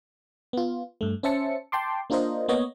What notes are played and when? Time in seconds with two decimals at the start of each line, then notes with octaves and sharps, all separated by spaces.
0.53 B3 F4
1.01 G2 A3
1.23 C#4 C5 E5 A5 C#7
1.72 G5 A5 C6 D6
2.10 A#3 D4 F4 A#4 C5 D#5
2.48 A#3 B3 C#5 D#5